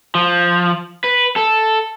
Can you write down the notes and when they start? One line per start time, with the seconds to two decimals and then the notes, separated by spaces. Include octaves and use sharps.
0.15 F3
1.04 B4
1.36 A4